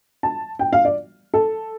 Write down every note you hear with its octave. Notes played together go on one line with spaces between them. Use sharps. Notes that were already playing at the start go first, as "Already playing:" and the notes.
A5
G5
F5
D5
A4